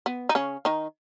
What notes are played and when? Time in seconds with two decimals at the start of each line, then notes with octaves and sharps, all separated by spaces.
0.06 B3
0.29 D#4
0.35 C#3 C#4
0.65 D#3 D#4